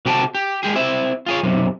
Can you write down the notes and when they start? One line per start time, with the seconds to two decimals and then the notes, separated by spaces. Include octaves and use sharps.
0.06 C3 F#4 G4 A4 G5 A5
0.35 G4
0.63 G#3 G4 G#4
0.75 C4 E4 E5
1.26 F4 G#4 C#5
1.43 B1 F#2 C3